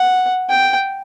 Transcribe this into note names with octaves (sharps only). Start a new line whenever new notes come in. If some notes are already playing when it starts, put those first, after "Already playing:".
Already playing: F#5
G5